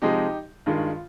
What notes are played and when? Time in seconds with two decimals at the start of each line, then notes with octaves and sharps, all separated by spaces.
0.02 C3 F3 G#3 D#4 G4
0.66 G2 D#3 G#3 F4